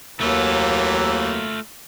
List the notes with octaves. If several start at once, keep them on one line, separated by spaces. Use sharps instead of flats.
D#2 E3 F#3 A3 A#3 F4